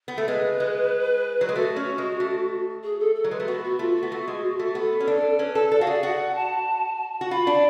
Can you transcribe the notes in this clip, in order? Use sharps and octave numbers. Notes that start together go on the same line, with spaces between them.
B3
A3
G#3 B4
G#3
F#3
G#3
A3 F#4
C#4
G#3
A3
G#4
A4
A4
F#3
G#3 B4
A3
B3 F#4
F#4
A3 F4
F#4
B3
A3
G#3
A3
B3 A4
C#4
D4
C#4 B4
A4
A4 D5
F#4 F5
G#4 D5
F#4 F#5
A5
F#4
F4 B5
D4